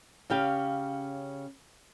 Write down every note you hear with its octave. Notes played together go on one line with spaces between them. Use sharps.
C#3 C#4 G4 F5